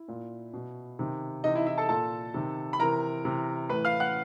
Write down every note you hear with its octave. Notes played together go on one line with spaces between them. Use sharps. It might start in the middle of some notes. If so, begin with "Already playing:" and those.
Already playing: E4
A#2
B2
C3 D#3
C3 E3 D#4 D#5
E4 E5
E4 E5
A4 A5
A#2 A4 A5
C3 D#3
B5
C3 E3 A#4 A#5
C3 E3
A2 E3 B4 B5
F5 F6
F#5 F#6